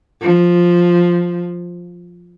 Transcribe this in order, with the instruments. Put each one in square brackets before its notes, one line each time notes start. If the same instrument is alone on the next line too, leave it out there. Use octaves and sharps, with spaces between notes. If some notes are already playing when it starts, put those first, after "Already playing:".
[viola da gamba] F3